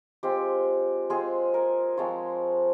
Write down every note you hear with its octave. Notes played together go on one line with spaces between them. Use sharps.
G#3 C4 F4 G4
G#3 C4 F4 G#4
A#4
F3 G#3 C4 F4 C#5